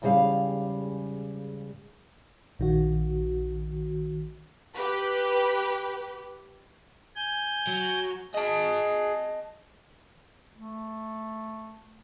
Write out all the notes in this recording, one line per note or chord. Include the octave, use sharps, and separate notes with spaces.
E2 G#2 C#3 G3 F5
A#1 D#3 F#4
G4 B4
G#5 G6
F#3
G#4 D#5 A5
A3